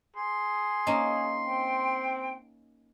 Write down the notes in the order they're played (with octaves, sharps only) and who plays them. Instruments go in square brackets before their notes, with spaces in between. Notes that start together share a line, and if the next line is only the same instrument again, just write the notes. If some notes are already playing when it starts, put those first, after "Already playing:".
[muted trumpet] G#4 [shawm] C6
[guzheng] A#3 C#4 D#4
[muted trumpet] C4 [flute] G5